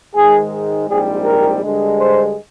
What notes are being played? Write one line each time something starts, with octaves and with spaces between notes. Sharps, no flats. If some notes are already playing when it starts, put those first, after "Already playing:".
G#2 D#3 G#3 G#4
A#1 G#2 G3 C4 G#4
A#4
G2 D3 G#3
C5